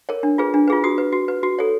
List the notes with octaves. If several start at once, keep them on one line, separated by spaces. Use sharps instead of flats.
A#4 C#5
D4
F4 G#4 B4
D4
F4 G#4 B4
F#4 D#6
B4
F#4
B4
F#4
A4 C#5